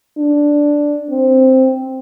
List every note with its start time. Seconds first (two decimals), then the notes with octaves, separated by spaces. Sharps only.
0.18 D4
1.10 C4